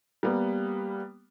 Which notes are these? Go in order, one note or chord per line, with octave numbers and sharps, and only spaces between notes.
G3 A#3 B3